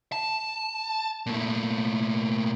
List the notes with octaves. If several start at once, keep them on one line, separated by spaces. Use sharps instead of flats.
A5
A#2 A3